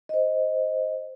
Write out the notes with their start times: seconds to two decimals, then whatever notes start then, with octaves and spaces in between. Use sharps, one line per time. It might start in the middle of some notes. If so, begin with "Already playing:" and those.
0.09 C5 D#5